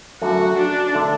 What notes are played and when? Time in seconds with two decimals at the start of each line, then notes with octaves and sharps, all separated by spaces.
0.21 F#2 D3 A3 D4 F#4
0.58 D4
0.94 D3 A3 D4